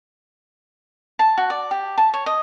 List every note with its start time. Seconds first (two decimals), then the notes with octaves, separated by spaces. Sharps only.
1.19 A5
1.37 F#4
1.50 D5
1.71 G4
1.98 A5
2.14 C#5
2.26 D#5